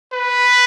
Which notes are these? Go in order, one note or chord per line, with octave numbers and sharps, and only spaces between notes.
B4